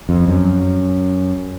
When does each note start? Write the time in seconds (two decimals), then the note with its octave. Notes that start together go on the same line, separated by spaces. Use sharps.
0.09 F2
0.28 F#2